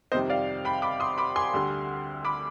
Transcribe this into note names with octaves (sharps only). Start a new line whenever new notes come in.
F2 C3 D#3 G3 C5 D#5
D5 F5
G5 B5
B5 D6
C6 D#6
B5 D6
G#5 C6
D2 D3 G3
B5 D6